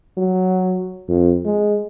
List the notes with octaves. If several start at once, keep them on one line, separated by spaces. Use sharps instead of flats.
F#3
F2
G#3